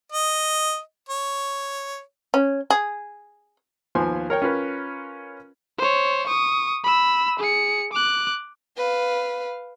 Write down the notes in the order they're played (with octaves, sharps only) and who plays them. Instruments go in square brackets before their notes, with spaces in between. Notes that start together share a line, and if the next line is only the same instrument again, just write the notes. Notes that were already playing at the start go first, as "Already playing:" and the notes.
[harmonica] D#5
C#5
[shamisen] C#4
G#4
[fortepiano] D#2 F3 B3 G#5 C6
A#4 C#5 G5
C#4 F4 A#4 B4
[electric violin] C5 C#5
C#6 D#6
B5 E6
G#4 C#7
D6 F#6
[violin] B4 F5